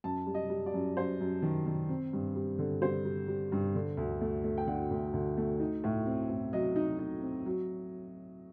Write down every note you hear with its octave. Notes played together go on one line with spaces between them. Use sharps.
F#2 A5
G3
D#5
G3
D5
F#2
F#2 C5
F#2
D#3
D#3
C4
G2
G3
D3
G3 C5
G3
G3
G2
D3
D2
A3
A3
G5
D3 F#5
D2
D2
A3
D#4
A2
C4
A2
F#3 D#5
D#4
D#4
C4
F#3